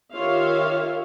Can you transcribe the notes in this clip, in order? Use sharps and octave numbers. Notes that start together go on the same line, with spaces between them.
D#3 F4 G4 C#5 E5 F5